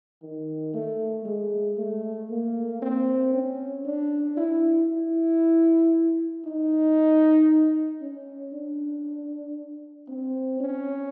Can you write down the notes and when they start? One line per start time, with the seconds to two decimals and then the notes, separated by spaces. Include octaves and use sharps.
0.22 D#3
0.74 A3
1.25 G#3
1.78 A3
2.30 A#3
2.82 C4
3.33 C#4
3.85 D4
4.37 E4
4.90 E4
6.45 D#4
8.01 C#4
8.53 D4
10.09 C4
10.60 C#4